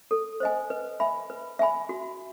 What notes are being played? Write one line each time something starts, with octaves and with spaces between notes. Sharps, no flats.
A4
C5 D#5 G#5
B4
E5 G#5 B5
B4
E5 G#5 B5
F#4